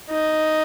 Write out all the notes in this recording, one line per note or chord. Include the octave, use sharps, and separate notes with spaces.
D#4